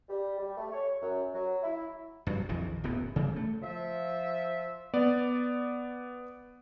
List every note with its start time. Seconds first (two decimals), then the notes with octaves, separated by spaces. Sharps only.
0.09 G3
0.38 G3
0.58 A3
0.73 C#5
1.02 F#2
1.34 F#3
1.63 E4
2.27 G2 F#3
2.49 A#1 F2 D#3 E3
2.84 D1 F#2 B3
3.16 C#3 E3 G3
3.36 A3
3.62 F3 E5
4.93 B3 D5